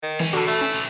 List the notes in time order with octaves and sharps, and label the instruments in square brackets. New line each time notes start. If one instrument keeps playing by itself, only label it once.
[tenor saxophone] D#3
[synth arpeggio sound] E3 [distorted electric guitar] G#3 C#4
[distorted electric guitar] B2 [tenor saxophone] D3 [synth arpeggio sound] F#4 A4
[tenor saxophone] A3
[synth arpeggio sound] C#4 [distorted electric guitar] E4
[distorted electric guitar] B1 D3